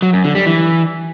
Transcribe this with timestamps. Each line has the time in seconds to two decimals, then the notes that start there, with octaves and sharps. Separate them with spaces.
0.02 F#3
0.13 F#2
0.24 D3
0.35 G3
0.46 E3